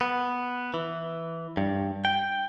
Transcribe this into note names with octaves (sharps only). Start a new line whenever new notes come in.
B3
E3
G2
G5